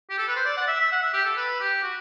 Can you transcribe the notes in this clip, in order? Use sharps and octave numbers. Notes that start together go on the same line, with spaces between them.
G4
A4
B4
C5
D5
F#5
E5
E5
F#5
E5
G4
A4
B4
G4
F#4